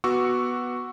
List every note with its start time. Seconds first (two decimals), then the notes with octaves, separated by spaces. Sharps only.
0.04 B3 F#4 C#6 D6 E6